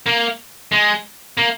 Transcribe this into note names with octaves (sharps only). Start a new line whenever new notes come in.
A#3
G#3
A#3